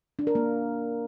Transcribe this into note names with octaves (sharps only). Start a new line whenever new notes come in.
D4
A#4
A#3